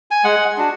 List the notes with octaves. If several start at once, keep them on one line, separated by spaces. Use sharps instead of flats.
G#5
G#3 F#5
D4 F#4